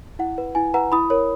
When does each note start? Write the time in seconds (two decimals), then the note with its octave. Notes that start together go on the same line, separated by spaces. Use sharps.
0.19 E4 F#5
0.38 B4
0.55 E4 G#5
0.74 B4 F#5 A#5
0.92 E4 B5 D#6
1.10 A#4 C#5